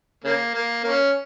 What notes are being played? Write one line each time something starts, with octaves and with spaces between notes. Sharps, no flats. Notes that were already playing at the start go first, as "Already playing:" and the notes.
C#3 A#3
A#3
A#3 C#4